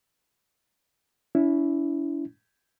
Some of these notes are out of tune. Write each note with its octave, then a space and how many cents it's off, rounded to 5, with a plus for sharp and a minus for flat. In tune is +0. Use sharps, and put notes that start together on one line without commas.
C#4 +45 E4 +0